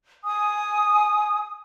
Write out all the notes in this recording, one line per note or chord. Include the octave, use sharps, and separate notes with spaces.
G#5 D#6